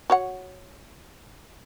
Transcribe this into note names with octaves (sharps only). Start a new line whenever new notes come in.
F#4 C#5 F#5